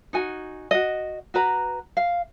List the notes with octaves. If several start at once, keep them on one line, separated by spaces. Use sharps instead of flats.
D#4 F#4 G#5
F#4 D#5
F#4 B4 A#5
F5